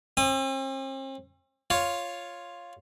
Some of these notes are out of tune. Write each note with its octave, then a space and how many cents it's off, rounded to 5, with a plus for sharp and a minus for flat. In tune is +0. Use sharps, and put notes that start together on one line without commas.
C4 +45 D#6 -20
F4 +0 C#5 +0